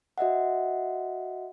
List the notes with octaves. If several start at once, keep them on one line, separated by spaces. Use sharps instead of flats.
F#4 D#5 E5 F#5